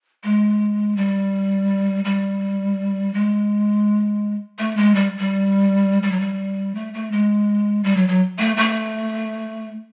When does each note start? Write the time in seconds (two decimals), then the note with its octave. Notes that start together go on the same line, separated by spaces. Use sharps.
0.24 G#3
0.97 G3
2.05 G3
3.14 G#3
4.59 A3
4.77 G#3
4.95 G3
5.19 G3
6.03 G3
6.12 F#3
6.20 G3
6.75 A3
6.94 A3
7.12 G#3
7.84 G3
7.97 F#3
8.08 F#3
8.39 A3
8.57 A3